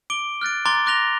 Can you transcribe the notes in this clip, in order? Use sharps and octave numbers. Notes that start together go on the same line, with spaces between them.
D6 D7 G7
F6 F#6 A6 D7
A#5 C6 D6 F#6 A6 G7
D6 F#6 A#6 F7 G7